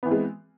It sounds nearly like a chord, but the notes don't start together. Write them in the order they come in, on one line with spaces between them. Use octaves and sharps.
B3 E3 C4 G#3